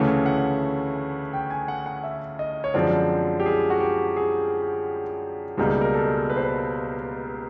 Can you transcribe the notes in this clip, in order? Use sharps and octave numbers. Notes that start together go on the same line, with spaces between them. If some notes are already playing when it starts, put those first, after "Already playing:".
Already playing: D2 C#3 E3 A3 C#4
F#5
G5
G#5
F#5
F#5
E5
D#5
C#5
F#2 D3 F3 G#3 C4 D5
G4
G#4
F#4
G4
G#4
C#2 B2 G3 A#3 D#4 G#4
A#4
A4
B4
C5
B4